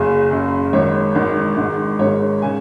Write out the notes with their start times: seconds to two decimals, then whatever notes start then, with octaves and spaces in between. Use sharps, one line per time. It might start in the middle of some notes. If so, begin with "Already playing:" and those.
Already playing: F#1 F#2 C#3 G#4
0.31 F#1 F#2 C#3
0.73 G#1 G#2 D#3 C#5
1.15 G#1 G#2 D#3
1.57 G#1 G#2 D#3
1.99 G#1 G#2 D#3 C#5
2.42 C#3 G#5